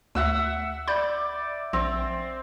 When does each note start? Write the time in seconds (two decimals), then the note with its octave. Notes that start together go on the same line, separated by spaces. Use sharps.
0.15 D2 E5 F#5 E6
0.87 D5 B5 G6
1.73 A#1 C4